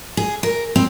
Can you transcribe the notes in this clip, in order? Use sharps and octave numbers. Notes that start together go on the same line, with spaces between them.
G#4
A#4
C4